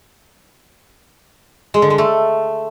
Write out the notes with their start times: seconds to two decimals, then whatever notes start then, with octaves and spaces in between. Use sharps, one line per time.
1.74 G#3
1.82 D3
1.90 G#3
1.98 A3